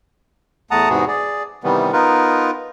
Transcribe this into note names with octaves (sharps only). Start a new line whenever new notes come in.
E2 A3 F#5 A5 A#5 D#6
E2 G#2 C3 B3 F#4 G#4
G#4 D5
C3 D#3 E3 G3 B3
B3 D#4 F4 A#4 B4